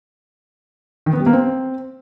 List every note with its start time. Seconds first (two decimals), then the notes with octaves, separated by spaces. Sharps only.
1.06 D#3
1.13 B3
1.20 G3
1.26 A#3
1.33 C4